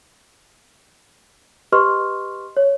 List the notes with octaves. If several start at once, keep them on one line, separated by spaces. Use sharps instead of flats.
G4 B4 D#5 C6 C#6 F6
C#5